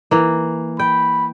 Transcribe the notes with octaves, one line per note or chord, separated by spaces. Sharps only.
E3 A#3
G5 B5